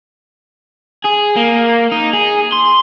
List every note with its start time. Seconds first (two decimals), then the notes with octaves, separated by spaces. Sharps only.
1.05 G#4
1.37 A#3
1.92 D#4
2.13 G#4
2.52 C6